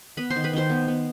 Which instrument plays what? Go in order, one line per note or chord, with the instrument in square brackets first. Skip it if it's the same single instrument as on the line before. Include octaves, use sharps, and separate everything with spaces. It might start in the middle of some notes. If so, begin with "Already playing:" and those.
[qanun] B3 B4 B5
C5 C6
D#3
B4 B5
D#3 C5 C6
B3
B3